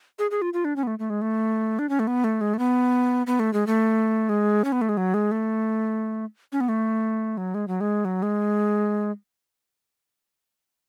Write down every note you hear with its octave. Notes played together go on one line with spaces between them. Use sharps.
G#4
G#4
F4
F4
D4
C#4
B3
A3
A3
G#3
A3
D4
C#4
A3
B3
A3
G#3
A3
B3
B3
A3
G#3
A3
G#3
C#4
B3
A3
G#3
F#3
G#3
A3
C#4
B3
A3
F#3
G#3
F#3
G#3
F#3
G#3